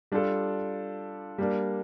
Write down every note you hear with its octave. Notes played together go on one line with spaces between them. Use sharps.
G3 D4 F4 A4
G3 A#3 D4